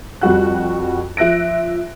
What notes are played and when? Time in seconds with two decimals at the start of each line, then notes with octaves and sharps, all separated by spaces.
0.21 F2 G3 F#4 F#6
1.17 F3 E5 F#6 A#6 D7